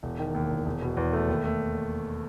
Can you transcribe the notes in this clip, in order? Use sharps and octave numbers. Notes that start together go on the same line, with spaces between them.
E1
D#3
D#2
E1
E1
B2
E2
A3
D#2
A3